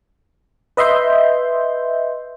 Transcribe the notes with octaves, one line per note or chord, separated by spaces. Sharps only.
B4 D#5 E5 C6 G6